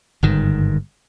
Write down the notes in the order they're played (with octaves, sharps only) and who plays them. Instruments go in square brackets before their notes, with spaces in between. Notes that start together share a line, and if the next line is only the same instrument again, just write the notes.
[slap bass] G1 G#2 D#3